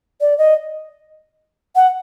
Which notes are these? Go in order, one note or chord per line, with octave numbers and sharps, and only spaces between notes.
D5
D#5
F#5